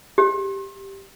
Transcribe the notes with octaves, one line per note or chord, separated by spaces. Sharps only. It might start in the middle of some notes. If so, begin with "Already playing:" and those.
G4